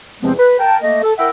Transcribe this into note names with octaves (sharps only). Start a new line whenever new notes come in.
E2 C3 F3 G#3 B3 C4
B4
A#4 G5 A5
A3 A#3 D#5
A4
E4 A#4 E5 F#5 G5 E6